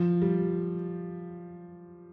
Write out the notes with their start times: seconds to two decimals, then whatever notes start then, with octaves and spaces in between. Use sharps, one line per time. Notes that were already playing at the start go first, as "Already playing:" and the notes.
Already playing: F3
0.22 G3